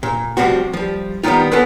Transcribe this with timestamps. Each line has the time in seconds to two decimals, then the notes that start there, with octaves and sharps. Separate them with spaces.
0.03 A#2
0.37 A2 F3 G3 C4 F#4
0.73 F3 G3
1.23 D#3 G3 B3 C#4 D#4 F4
1.52 B3 C#4 F4 A4 B4